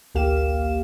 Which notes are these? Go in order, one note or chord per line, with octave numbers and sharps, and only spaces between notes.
A1 D2 A#3 G4 F5 E7